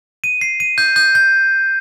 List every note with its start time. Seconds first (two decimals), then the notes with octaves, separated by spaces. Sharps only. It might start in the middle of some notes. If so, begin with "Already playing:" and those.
0.24 D#7
0.41 C7
0.60 D#7
0.78 G6
0.96 G6
1.15 G6